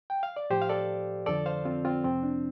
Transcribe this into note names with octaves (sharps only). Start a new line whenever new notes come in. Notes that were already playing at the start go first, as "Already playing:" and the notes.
G5
F5
D5
A2 F3 G4 C5
F5
A4 D5
F2 D3 F3 A4 D5
C5 F5
C4 F4
C4 F4
F2 C3 F3 C4
D4